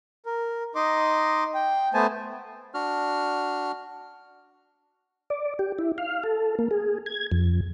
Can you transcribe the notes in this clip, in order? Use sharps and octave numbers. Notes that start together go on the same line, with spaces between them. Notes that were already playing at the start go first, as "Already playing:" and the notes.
A#4
D#4 D#5 C6 D6
G5
A3 B3 C5 G#5 A5
D4 F#4 F6
D5
G4
E4
F5
A4
A#3
G#4
G#6
F2